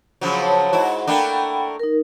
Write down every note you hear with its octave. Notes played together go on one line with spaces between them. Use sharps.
C#3 F3 F#3
C5 C#5 A5
G#2 E4 F#4
A3 A#3 D4 F#5 G5 B5
D#4 A#4